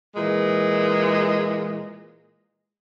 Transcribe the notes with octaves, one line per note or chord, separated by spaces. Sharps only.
A#2 E3 G#3